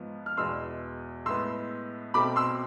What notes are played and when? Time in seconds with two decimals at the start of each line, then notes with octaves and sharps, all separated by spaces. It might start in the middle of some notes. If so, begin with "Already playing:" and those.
Already playing: G#2 F3 B3
0.26 F6
0.37 E2 B2 G#3 B3 C6 E6
1.26 A2 G#3 B3 C6 E6
2.14 B2 A3 C4 B5 D6
2.36 C6 E6